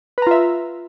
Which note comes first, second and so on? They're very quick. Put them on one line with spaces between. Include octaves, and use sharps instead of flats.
B4 A#5 F4 E5